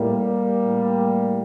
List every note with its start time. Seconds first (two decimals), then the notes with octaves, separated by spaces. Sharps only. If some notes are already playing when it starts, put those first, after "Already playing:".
Already playing: A2 G3 A#3
0.62 A2